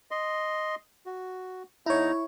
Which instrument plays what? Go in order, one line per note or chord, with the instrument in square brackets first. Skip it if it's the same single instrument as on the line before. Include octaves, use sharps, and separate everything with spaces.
[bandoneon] D#5 C6
F#4
[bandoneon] E2 D#4 A#5 [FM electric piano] E4 C#5